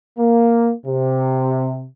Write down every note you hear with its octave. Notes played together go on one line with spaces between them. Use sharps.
A#3
C3